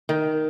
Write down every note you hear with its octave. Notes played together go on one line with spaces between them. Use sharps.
D#3